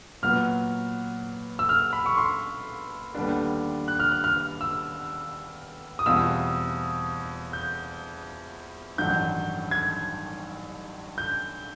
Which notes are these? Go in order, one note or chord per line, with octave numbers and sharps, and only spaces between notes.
A#2 F#3 B3 F6
E6
F6
B5
C#6
C6
D#2 D3 G3 B3 D4
F#6
F6
F#6
F6
E6
D#6
E2 B2 G3 C4 F4 E6
G6
A1 G2 D#3 F#3 G6
G#6
G6